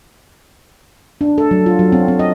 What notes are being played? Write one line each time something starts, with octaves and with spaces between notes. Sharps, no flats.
D4
A4
F#3
F4
F#3
C4
C4
D#5